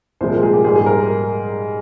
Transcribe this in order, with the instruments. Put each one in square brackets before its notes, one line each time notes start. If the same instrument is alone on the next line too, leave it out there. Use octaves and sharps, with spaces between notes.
[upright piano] C2 A#2 F3 G#3 C5
A#4
G#4
G4
G#2 G3 G#4
G#4
A#4